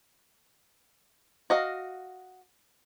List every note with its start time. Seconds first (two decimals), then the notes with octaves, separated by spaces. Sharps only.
1.50 F#4 D#5 F5